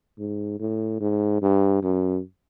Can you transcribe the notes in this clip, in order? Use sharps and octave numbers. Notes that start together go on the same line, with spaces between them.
G#2
A2
G#2
G2
F#2